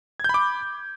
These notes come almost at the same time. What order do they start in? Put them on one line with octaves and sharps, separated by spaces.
G#6 G6 B5 D6